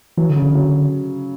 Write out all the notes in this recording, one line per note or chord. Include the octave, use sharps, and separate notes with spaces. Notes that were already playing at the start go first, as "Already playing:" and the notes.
E3 F#3
D3
C#3
D3
F#3